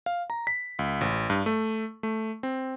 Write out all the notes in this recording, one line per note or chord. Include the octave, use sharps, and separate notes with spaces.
F5
A#5
B6
C#2
A1
G2
A3
A3
C4